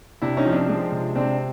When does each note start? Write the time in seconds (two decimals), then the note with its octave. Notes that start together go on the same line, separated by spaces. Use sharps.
0.22 C3 D4 E4
0.37 C#4 D#4
0.46 F3
0.53 C4 D4
0.69 G#3
0.92 C3
1.15 C3 C4 D4